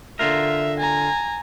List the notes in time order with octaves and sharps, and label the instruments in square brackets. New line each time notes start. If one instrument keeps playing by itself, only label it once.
[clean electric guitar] D3 F4 A#4 [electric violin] E5
[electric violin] G#5 A#5